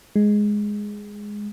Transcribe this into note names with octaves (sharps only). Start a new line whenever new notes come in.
G#3